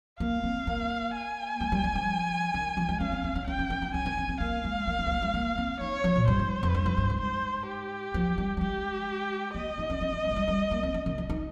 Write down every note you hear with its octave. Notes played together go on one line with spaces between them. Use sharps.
A#3 F5
C4
A#3
G#5
G#3
G3
G3
F3
D#3
F3
G#3
C#4 F5
C4
C4
C#4
C#4 G5
C#4
C#4
C#4
C#4 G#5
C#4
C4
C4
A#3 F5
G#3
A#3
G#3
C4
A#3
G#3
A#3
C4
D#4 C#5
F3
A#2
G2 C5
G#2
F2
G2
F2
G2
G#2
C5
G4
F3
G3
G3
G#3 G4
A#3 D#5
D#4
C#4
C#4
C4
G#3
F3
G3
G3
A#3
C4
C#4
D#3
F3
D#4